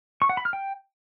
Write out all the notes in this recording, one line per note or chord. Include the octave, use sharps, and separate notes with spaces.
C#6
F#5
B5
F6
G5